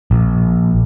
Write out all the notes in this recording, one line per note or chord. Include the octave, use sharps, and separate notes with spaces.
A#1